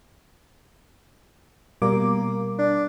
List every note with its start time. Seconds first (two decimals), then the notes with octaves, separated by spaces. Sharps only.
1.82 B2 G3 A#3 D6
2.59 D4